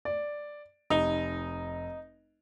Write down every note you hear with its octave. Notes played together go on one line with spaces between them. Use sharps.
D5
F1 D#4 F7 G7